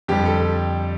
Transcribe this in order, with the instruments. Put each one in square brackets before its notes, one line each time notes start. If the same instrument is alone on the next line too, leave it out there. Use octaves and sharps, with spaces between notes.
[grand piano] F2 D3 G3 G4
A4